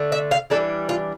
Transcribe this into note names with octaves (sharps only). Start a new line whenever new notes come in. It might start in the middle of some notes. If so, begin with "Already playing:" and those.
Already playing: D3 A3
E5
F5
E3 G3 D4 A4
F4